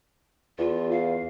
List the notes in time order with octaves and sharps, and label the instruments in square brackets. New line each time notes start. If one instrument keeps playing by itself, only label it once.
[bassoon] E2 [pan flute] F4
[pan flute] F5